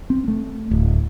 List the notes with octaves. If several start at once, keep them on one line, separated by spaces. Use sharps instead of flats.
C4
A3
D1